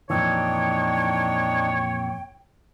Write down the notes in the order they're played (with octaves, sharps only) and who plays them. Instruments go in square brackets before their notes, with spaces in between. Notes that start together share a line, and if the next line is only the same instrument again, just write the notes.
[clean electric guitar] F2 A#2 E3 [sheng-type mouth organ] D4 D#4 [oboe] C#5 [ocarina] G5